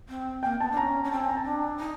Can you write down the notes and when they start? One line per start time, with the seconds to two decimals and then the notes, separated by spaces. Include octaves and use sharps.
0.09 C4
0.43 A#3 G5
0.60 B3 A5
0.72 D4
0.77 C#4 A#5
1.04 C#4
1.11 C4 A5
1.20 G#5
1.29 A#5
1.37 A5
1.45 D4
1.79 D#4 A#5